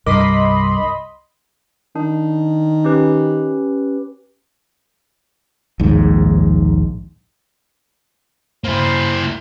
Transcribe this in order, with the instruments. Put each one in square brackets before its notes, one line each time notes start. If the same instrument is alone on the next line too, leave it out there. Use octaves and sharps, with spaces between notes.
[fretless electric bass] C2 G2 [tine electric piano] A#4 D6 [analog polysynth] D#5 B5 C6
[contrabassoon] D#3 [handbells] D4
[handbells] C#4 G4 B4
[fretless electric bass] A#1 D#2 G#2
[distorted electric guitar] A#3 E4 [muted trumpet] C5